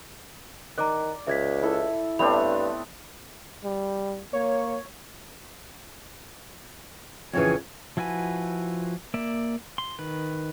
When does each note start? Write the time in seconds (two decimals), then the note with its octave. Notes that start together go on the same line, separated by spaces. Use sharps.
0.78 D#3 D5 A#5 D6 F#6
1.27 C#2 E5 G#6 B6
1.62 E4 A4
2.19 G2 A3 B3 C4 D4 C#5 B5 F7
3.64 G3
4.33 A#3 C#5
7.33 F2 C#3 E3 G#4 C#5 G#5
7.97 F3 E4 F#4 B4 G#5
9.14 A#3 D5 E5
9.78 C6
9.99 D#3 B4